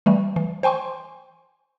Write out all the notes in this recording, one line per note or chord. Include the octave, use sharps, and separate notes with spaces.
E3 G3 A3
E3
C5 G5 G#5 C6 C#6